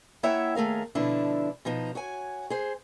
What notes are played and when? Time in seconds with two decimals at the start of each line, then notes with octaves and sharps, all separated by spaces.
0.23 A#3 E4 C#5 E5 F#5 G5
0.55 D#2 A3 G#4 A#4 F5
0.95 B2 D3 F3 D4 E4
1.65 B2 F3 D#4
1.95 F#4 C#5 G#5
2.50 G#4 C5